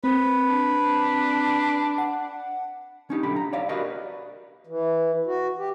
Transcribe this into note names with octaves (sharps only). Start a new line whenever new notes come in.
C4 B4
D4
F#5
C#4 D#4 G4
B1 D3 G4 B5
A#5
C#5 D5 F5
F#4 G4 A#4 B4 D5 D#5
E3
F#4
G4